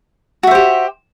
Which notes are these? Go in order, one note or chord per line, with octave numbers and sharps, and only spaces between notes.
F#4 G4 C5 E5